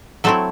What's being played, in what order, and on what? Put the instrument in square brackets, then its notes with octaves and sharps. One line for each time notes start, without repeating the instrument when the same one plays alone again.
[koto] F#3 A3 C4 E4 E5